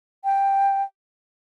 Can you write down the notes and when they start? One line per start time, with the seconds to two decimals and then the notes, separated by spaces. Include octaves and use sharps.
0.24 G5